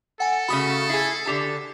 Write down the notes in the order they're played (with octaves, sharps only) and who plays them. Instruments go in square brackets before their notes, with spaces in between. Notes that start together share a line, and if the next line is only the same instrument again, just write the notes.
[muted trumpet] A4 [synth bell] F#5 G#5
[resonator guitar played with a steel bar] C#3 A3 F#4 [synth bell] B5 D#6
[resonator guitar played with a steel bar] E4 G#4 [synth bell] C7
[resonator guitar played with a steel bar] D3 G4 A5